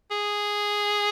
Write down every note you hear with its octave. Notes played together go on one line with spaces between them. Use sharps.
G#4